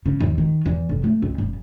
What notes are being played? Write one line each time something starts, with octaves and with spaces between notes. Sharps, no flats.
C#3
D#2
D#3
E2
F1
A3
C#2
F#1